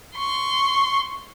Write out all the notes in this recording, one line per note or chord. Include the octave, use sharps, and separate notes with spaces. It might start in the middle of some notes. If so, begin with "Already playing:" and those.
C6 C#6